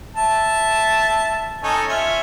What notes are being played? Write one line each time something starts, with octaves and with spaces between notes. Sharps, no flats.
E5 A5
C#4 D#4 A4
C#4 F4 E5